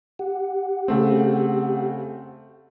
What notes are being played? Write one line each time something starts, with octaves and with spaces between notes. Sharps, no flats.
G4 F#5
C#3 A3 C4